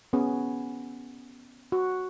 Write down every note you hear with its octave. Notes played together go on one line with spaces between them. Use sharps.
B3 C#4 G#4
F#4